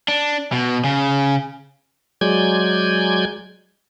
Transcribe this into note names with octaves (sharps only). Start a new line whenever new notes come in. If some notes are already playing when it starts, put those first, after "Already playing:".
D4
B2
C#3
F#3 G#3 D5 G#5 G6 G#6